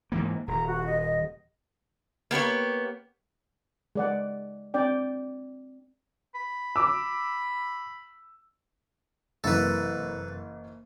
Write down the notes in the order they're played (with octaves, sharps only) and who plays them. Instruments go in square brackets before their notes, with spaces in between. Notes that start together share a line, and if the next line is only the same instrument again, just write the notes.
[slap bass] G#2 E3 A#3
[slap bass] D#1 [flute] A#5
[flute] F#4
D#5
D#5
[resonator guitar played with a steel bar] A#3 B3 G4 C#5
[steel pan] G#3 D5 F#5
C4 D4 D5 G5
[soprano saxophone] B5
[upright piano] D6 E6
[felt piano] F#1 E3 A#3 [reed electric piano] F#2 C3 [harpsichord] A4 B4